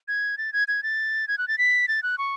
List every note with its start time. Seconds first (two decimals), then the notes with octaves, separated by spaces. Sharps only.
0.08 G#6
0.38 A6
0.53 G#6
0.68 G#6
0.83 A6
1.28 G#6
1.38 F#6
1.48 A6
1.58 B6
1.88 A6
2.03 F#6
2.18 C#6